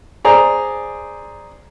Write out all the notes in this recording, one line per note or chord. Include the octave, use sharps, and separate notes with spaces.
G#4 C5 D5 A#5